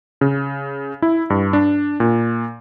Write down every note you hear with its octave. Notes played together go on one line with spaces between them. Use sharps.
C#3
E4
G2
D4
A#2